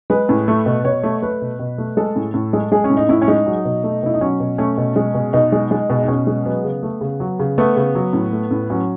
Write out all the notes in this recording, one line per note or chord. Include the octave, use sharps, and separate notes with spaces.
G#3 B4
A2
A3
B2
B2 C#5
A3
A3 B4
B2
B2
A3
G#3 A4
A2
A2
G#3
G#3 G#4
C#4
A2
D#4
A2 E4
C#4
G#3 D#4
F#3
B2
A3
B2 E4
D#4
F#3 C#4
B2
A3 C#4
B2
G#3
B2
B2 D#4
G#3
G#3
B2
D#4
B2 C#4
G#3
F#3 B3
C#3
A3
C#3
F#3
C#3
A3 B3
C#3
F#3
A2
A3
A2
F#3 C#4